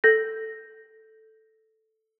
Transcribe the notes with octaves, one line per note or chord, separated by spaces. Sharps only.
A4 G6 A#6